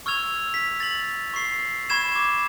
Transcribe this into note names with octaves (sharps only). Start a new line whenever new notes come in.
C#6 E6 F6 G#6 F7
B6
A6 F#7
C#6 C7
B5 C#6 G#6 E7
C#6 D6